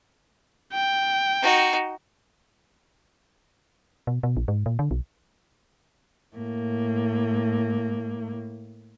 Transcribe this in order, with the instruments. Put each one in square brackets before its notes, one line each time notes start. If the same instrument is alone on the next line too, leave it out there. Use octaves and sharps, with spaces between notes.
[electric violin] G5
[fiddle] D#4 F#4
[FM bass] B2
B2
A#1
G#2
A#2
D3
B1
[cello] A2 A#3